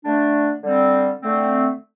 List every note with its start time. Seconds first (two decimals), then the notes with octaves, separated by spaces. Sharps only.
0.04 D3 A3 D4
0.62 D3 G3 C4
1.21 D3 A3 C4